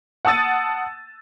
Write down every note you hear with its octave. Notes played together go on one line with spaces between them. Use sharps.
F#5 A5 D#6 E6 A6 D#7